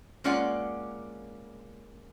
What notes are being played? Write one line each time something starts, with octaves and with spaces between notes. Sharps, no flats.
G#3 A#3 C#4 F4 D5 F#5